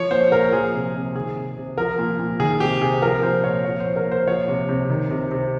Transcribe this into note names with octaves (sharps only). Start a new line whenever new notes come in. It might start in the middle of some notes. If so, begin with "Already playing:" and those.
Already playing: F3 C#5
A#2 C5
A#2 A#4
F3 G#4
C3
C3
D#3 G#4
C3
C3
F3 A#4
A#2
A#2
D#3 G#4
C3 G4
C3 G#4
F3 A#4
A#2 C5
A#2 C#5
F3 C#5
A#2 C5
A#4
A#2
C5
F3 C#5
C3
C3
D#3
C3
C3